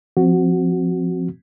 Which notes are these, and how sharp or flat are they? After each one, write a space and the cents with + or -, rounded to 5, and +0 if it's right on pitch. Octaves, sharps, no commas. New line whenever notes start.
F3 +0 C4 +0 F#4 +0